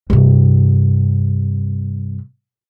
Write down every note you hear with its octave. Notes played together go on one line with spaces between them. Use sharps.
G2 C3